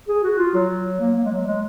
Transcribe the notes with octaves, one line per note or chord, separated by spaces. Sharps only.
G#4
F#4
F4
F#3
A#3
A#3
G#3
F#3
G#3